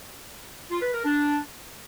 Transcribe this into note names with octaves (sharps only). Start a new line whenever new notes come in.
F4
B4
A#4
D4